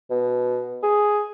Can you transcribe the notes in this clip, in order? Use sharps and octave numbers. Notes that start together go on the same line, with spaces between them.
B2
G#4